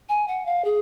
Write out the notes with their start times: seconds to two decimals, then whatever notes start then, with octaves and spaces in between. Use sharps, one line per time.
0.09 G#5
0.28 F#5
0.46 F5
0.65 G#4